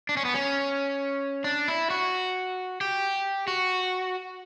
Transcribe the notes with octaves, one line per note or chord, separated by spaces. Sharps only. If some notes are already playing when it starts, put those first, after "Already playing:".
D4
C#4
B3
C#4
D4
E4
F#4
G4
F#4